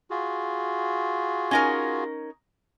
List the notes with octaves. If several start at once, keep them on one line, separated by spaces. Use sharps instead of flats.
F4 F#4 G#4
C#4 D#4 A#4